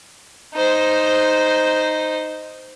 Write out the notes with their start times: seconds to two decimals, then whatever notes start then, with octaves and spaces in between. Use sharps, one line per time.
0.54 D#4 C5